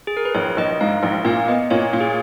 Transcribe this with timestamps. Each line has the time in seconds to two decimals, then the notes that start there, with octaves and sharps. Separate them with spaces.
0.07 G#4
0.17 A#4
0.25 B4
0.34 A#1 C#5
0.57 A#1 D#5
0.81 G#2 F5
1.03 A#1
1.25 A#2 F5
1.48 B3 D#5
1.70 A#2 C#5
1.93 A#2
2.01 G#4